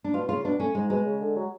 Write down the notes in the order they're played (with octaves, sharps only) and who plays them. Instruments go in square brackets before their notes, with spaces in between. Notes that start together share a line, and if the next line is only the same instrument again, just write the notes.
[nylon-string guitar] D4
[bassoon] B2 [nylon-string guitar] F4
[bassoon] C#3 [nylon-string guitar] F4
[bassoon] B2 [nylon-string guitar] D4
[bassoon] A2 [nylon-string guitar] C#4
[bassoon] G#2 [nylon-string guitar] G#3
[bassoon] B2 [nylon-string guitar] G#3
[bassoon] C#3
D3
F#3